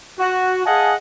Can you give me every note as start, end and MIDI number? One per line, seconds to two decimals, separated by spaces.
0.19 0.66 66
0.66 0.94 68
0.66 0.94 75
0.66 0.94 77
0.66 0.94 78
0.66 0.94 80
0.66 0.94 81